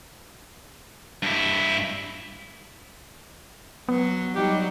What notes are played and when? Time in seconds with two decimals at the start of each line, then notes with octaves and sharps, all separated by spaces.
1.23 G2 E4
3.89 F#3 B3
4.35 F#3 G3 D#4 G4